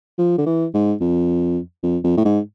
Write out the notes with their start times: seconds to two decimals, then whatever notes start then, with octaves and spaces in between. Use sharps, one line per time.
0.18 F3
0.38 D3
0.46 E3
0.74 G#2
1.00 F2
1.83 F2
2.04 F2
2.17 A2
2.25 G#2